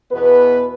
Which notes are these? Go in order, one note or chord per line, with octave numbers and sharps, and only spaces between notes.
E2 B2 B3 B4